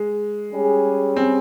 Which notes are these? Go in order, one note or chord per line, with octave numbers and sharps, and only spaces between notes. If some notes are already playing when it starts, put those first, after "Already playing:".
Already playing: G#3
G3 C#4 G#4
C4